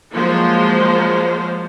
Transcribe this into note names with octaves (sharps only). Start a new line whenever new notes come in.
F3 F#3 G#3 A#3 F4 C5